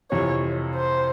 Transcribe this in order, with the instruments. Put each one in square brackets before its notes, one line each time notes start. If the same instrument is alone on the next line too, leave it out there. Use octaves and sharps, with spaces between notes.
[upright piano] F2 C3 E3 [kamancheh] C#5
[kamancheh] C5